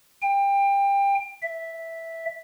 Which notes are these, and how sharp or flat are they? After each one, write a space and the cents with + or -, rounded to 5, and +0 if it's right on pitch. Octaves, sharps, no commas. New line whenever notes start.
G5 +25
E5 -5